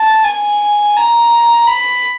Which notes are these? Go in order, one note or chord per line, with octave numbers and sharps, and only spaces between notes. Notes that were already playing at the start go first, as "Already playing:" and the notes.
Already playing: A5
G#5
A#5
B5